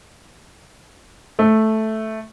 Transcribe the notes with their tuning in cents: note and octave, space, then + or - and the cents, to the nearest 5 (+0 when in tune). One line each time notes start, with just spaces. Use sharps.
A3 -5